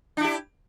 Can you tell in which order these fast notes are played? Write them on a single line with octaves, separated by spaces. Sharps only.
D4 E4 G4